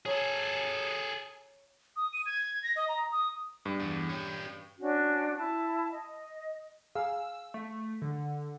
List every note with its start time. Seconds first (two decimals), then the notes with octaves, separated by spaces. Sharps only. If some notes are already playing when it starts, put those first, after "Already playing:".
0.05 G#4 A4 C#5 A#5
1.96 D#6
2.13 D#7
2.26 G#6
2.63 A#6
2.76 D#5
2.88 A#5
3.12 D#6
3.65 G2
3.80 E2
4.09 C#4 G4
4.79 C#4 D4 F#4
5.37 E4 A5
5.91 D#5
6.95 G#4 F5 E6
7.54 A3
8.02 D3